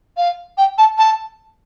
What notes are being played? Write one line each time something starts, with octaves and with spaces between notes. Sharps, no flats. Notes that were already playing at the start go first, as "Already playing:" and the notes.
F5
G5
A5
A5